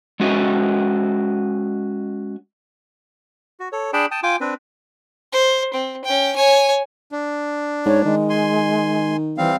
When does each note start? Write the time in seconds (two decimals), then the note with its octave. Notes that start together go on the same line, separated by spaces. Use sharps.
0.20 G#3 C#4 F#4 D#5 E5
3.60 F#4
3.72 A4 C#5
3.93 D4 G#4 D5 G5 A5 B5
4.11 G5 A5 D#6
4.23 F4 G5 G#5 D6
4.41 C4 D4 B4
5.32 C5
5.73 C4
6.04 C#4 G5
6.36 C#5 G#5
7.12 D4
7.86 G#2 C#5
8.05 D#3 G#3
8.30 G#5 C6
9.38 E3 G3 C4 F5